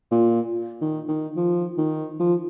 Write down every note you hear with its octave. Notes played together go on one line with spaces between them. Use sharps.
A#2
D#3
D#3
F3
D#3
F3